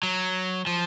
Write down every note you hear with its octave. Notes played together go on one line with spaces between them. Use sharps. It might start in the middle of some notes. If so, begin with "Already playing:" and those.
F#3
F3